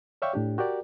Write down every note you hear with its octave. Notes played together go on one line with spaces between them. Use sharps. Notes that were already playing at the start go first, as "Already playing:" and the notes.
C#5 D5 E5 F5 G5 C#6
A2 D4 G4
F#4 G4 A#4 D5